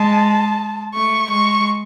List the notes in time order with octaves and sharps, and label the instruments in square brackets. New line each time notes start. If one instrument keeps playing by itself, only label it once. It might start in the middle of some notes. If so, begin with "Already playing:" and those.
Already playing: [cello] G#3 [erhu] A5
[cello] A3 [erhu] C#6
[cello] G#3 [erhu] C#6